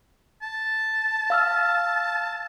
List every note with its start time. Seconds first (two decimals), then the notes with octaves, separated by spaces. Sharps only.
0.42 A5
1.30 F5 E6 F6